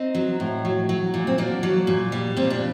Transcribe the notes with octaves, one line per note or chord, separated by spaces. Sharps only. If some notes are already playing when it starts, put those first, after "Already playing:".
Already playing: C4 D#4
F#3
A2
F#3
F#3
A#2
C4
F#3 A#3 D4
F#3
A#2
G3
A#2 C4
D4